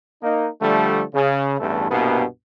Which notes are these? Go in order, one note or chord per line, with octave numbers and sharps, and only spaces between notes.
A#3 D#4
D3 F3 G3 A3
C#3
A1 E2 G2 A3
C2 G2 B2 A#3 B3